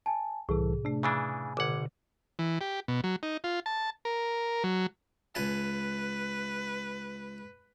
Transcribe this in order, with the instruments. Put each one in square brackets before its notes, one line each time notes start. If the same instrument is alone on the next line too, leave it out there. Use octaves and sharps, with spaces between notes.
[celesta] G#5 A5
[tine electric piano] C2 E3 A4 [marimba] A2 C3 [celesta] G#4
[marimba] C3 A3 [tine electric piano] D4
[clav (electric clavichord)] C#3 E3 D4 [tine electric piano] G#5
[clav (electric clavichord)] G#1 F#5 [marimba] B2 D3 [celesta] D6 G#6
[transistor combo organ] E3
G4
B2
F#3
D#4
F4
A5
A#4
F#3
[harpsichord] C#2 G#5 A5 [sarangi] B4